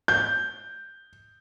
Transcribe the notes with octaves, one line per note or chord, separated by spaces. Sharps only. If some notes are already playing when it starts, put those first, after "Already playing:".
G6